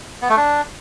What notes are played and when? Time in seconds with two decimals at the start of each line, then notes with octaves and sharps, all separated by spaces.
0.22 B3
0.29 A3
0.37 D4